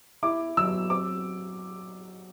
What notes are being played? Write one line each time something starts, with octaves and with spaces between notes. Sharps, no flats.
E4 D6
F#3 E6
C4 D6